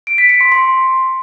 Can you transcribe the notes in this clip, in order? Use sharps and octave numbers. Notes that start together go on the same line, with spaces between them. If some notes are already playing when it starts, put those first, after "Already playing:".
D7
B6
C#7
C6
C6